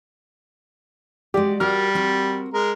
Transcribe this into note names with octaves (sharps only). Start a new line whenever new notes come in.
G#3 F#4 G4 D5
G3 F#4 A#4 F6
C4 F#4 A#4
G#3 A#4